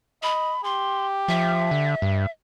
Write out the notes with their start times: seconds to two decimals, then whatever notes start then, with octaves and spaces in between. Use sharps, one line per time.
0.23 D#5 B5
0.64 G4 C6
1.28 F3 E5
1.71 D3
2.02 G2